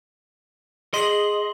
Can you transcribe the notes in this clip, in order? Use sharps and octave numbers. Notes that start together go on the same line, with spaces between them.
G#4 D#5 C6 F#7